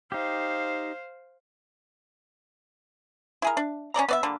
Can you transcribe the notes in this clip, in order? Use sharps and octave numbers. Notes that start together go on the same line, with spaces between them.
D#4 G4 C5 F5
E4 G#4 A#4
D4
C#4 A4 D5 A#5
B3 D5 E5
D3 G3 A#3